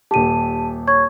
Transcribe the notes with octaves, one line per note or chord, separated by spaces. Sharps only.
D#1 G4 A5 D#7
C#5 C#6 G#6